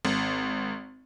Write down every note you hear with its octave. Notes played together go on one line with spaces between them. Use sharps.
G#1